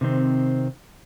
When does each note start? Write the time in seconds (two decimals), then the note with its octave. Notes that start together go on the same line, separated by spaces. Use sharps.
0.01 C3 D#3 C4